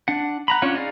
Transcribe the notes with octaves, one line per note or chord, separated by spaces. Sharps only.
D4 F#5
F#5 A#5 B5
C#4 D4 F4 C#5 F#5
D#4 G#4 D5 F5